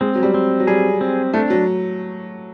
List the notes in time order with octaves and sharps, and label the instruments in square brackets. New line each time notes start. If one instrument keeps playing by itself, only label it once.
[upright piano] G#3 [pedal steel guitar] C4
[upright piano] F#3
G3
[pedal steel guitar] C4
[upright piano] F#3
[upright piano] G3 [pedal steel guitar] G#4
[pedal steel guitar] C4
[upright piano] A3 [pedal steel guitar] D4
[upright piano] F#3